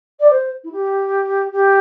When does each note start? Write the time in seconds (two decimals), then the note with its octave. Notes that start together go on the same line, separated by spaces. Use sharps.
0.20 D5
0.30 C5
0.64 E4
0.72 G4
1.52 G4